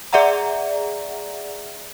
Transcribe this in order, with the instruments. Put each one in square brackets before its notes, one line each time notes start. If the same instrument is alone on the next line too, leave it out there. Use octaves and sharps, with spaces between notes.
[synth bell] G#4 D5 E5 F#5 A#5